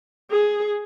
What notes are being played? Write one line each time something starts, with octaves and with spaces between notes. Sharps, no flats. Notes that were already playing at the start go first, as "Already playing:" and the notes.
G#4